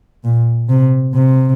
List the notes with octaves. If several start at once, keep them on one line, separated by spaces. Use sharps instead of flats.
A#2
C3
C3